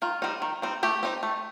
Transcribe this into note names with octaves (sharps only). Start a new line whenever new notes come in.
D#3 F4
G3 C4 D#4
D#3
G3 C4 D#4
A3 G4
C4 D#4
A3